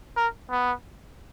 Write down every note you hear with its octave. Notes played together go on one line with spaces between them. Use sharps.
A#4
B3